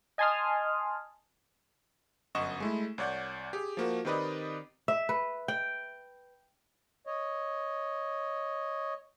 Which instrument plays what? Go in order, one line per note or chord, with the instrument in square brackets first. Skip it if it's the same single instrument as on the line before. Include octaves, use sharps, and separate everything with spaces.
[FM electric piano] D#5 G#5 A5 C6 D#6 F6
[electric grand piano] G1 F#2 D#5 F#5 C#6 E7
G#3 A3 E4
C2 C#5 D5 F#5 G6
G4 G#4
F3 A#3 F#4
D#3 C4 G4 B4 D5 D#5
[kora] E5
B4
G5
[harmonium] C#5 D#5